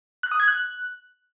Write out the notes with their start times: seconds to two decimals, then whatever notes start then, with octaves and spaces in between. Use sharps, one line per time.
0.23 F#6
0.31 D#6
0.40 G#6
0.48 F#6